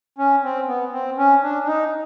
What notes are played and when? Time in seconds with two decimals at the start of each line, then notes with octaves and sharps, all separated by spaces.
0.18 C#4
0.43 C4
0.68 B3
0.93 C4
1.18 C#4
1.42 D4
1.63 D4
1.67 D#4